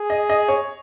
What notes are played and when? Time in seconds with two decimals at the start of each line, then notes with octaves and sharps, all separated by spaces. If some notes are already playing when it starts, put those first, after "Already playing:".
Already playing: G#4
0.10 D#5
0.29 D#5
0.48 C#5